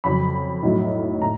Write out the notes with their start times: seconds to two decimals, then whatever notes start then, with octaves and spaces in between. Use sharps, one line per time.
0.04 F2 C#3 F#3 B5
0.63 B1 A2 F#3
1.22 A2 A#5